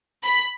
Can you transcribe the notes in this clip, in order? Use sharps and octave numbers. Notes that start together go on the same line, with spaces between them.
B5